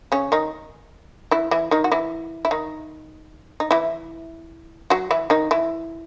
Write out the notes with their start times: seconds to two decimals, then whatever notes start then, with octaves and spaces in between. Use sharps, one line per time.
0.12 C#3 C#4
0.32 D#3 D#4
1.31 E3 E4
1.51 E3 E4
1.71 D#3 D#4
1.84 F#4
1.92 E3 E4
2.45 E4
2.51 D#3 D#4
3.60 D#4
3.71 E3 E4
4.90 F#3 F#4
5.11 E3 E4
5.30 D#3 D#4
5.51 E3 E4